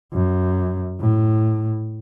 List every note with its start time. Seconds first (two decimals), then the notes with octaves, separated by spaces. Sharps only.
0.13 F#2
1.00 A2